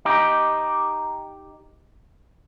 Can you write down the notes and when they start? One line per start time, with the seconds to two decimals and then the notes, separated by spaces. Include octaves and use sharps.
0.05 D#4 G4